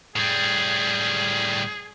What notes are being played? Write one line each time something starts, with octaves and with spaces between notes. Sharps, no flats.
A2 G3 G#4